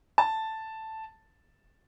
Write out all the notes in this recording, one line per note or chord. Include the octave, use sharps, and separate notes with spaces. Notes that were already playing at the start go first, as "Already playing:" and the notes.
A5